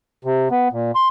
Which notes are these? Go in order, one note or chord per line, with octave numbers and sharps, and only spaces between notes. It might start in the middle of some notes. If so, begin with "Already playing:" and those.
C3
B3
A#2
C6